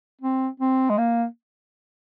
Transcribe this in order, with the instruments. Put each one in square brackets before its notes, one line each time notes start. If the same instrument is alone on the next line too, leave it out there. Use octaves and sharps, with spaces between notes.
[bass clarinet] C4
C4
G#3
A#3